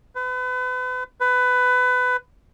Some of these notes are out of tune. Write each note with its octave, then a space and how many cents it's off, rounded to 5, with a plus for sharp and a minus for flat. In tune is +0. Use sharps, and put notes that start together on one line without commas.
B4 +35
B4 +20